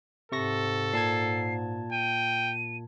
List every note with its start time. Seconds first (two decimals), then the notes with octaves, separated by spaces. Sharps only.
0.32 G#2 C3 A4 C#6 A#6
0.93 A#2 A5 G#6 C7
1.92 G5 D#7